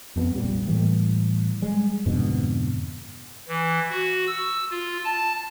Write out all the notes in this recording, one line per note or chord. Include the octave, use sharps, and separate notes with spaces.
F2 A3 B3
F1 A#1 A#2 G3
A2 E3 G3
G3 G#3
F2 G#2 B2 D3
E3
F#4
E6
F4
A5